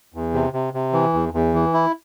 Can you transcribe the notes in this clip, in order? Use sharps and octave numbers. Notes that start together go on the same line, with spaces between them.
E2
C3
C3
C3
E3
E2
E2
E3
E4